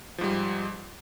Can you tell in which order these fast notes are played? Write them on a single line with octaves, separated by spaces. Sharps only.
F3 G#2 G3